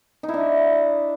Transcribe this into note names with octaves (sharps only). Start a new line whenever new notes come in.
D#4
E4
D4